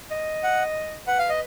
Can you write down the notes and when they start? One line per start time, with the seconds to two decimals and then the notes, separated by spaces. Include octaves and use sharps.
0.11 D#5
0.43 F#5
1.07 B4 F#5
1.19 F5
1.29 D#5